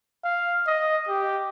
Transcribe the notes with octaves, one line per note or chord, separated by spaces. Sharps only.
F5
D#5
G4